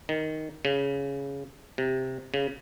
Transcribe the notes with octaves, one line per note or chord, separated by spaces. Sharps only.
D#3
C#3
C3
C#3